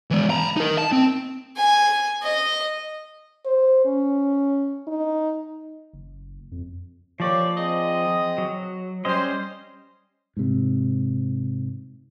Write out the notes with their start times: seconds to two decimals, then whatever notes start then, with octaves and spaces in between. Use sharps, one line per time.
0.11 E3 G#3
0.30 A#5 B5
0.57 D#4 A#4
0.78 A5
0.92 C4
1.57 G#5
2.23 D#5
3.46 C5
3.85 C#4
4.88 D#4
5.93 F#1
6.52 F2
7.20 F3 A#3 G4 C#5 D5
7.57 C4 G#4 D#5
8.38 F#3
9.05 G3 C#4 C5 D#5
10.37 G#2 C3